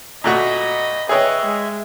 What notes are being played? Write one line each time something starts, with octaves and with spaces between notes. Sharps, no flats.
A#2 A3 F#4 D#5 B5
G#4 B4 C#5 D#5 E5 G5
G#3